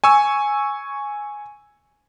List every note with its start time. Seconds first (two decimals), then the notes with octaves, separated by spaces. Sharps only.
0.04 G#5 C#6 E6